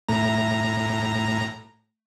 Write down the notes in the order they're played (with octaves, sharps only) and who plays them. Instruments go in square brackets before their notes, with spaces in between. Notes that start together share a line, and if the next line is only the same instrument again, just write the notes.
[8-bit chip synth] A2 A#5 [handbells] A3